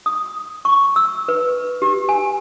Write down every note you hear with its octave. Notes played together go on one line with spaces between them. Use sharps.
D#6
C#6
E6
B4
G4
G#5